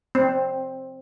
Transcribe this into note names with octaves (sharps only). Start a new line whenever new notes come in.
C4